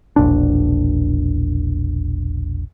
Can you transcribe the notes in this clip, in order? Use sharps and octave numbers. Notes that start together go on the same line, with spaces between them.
E1 A#1 D4